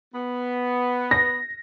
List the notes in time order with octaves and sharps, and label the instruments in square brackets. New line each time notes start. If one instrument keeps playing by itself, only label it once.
[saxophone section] B3
[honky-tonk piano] A#6